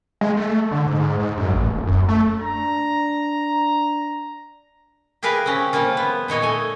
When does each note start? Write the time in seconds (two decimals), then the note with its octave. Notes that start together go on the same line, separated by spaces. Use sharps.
0.21 G#3
0.37 A3
0.72 D3
0.87 G#2
1.20 G#2
1.38 F#2
1.53 A1
1.68 D#1
1.87 F#2
2.08 A3
2.41 D4 A#5
5.23 G4 G#4 A#4 B4 F5
5.46 C4 C#4
5.73 F3 G3 A#3 F4
5.97 B3
6.28 A#2 D#4 C#5 D#5
6.42 A3 G#5